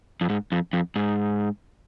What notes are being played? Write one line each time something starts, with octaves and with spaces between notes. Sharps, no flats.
F2
G#2
F2
F2
G#2